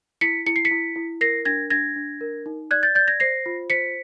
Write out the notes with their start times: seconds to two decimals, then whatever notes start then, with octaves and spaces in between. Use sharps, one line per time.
0.21 E4 B6 C#7
0.46 E4 C#7
0.56 C7
0.65 B6 C#7
0.71 E4
0.96 E4
1.21 A#4 A#6 C7
1.45 D4 G#6 A#6
1.70 D4 G#6 A#6
1.96 D4
2.21 A#4
2.46 D#4
2.71 D5 F#6 G#6
2.83 G6 A6
2.95 D5 G6 A6
3.08 G#6 A#6
3.20 C5 A#6 C7
3.46 F4
3.70 C5 B6 C#7